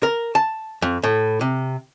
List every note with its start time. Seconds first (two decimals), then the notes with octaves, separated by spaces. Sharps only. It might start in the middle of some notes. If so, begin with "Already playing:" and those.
0.03 A#4
0.35 A5
0.82 F2
1.03 A2
1.41 C3